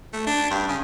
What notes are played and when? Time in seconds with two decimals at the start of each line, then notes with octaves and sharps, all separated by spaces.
0.13 A3
0.26 D4
0.50 G2
0.68 C#3